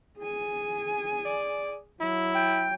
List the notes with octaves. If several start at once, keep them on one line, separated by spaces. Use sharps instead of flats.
G#4 G#5
D5
F#3 E4
G5